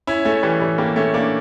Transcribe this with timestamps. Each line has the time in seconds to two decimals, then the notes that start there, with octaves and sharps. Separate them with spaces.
0.07 C#4 E4
0.25 A3 C#4
0.43 E3 G3
0.61 E3 G3
0.78 G3 A#3
0.96 A3 C#4
1.14 A#3 D4